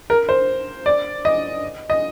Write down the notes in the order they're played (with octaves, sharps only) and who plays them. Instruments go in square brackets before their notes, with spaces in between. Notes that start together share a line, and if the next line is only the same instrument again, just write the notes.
[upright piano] A#4
C5
D5
D#5
D#5